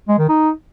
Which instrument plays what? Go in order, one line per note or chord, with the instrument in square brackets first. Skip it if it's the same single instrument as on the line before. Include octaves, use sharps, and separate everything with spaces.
[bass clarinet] G#3
D#3
D#4